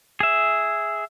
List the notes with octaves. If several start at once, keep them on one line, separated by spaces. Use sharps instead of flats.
G#4 E5